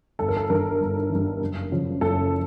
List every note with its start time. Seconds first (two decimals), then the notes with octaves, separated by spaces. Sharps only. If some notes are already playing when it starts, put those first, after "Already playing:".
0.19 G1 A4
0.28 A#4
0.37 A4
0.50 G2 D#3 A#4
0.81 G1
1.10 D#3
1.15 G2
1.41 F#1
1.71 F#2 C#3 F3
2.01 F#1 A4